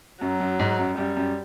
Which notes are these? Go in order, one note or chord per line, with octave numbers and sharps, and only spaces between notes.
F#2 F#3
F#2
G#2
F#2
F#2 G3
F#2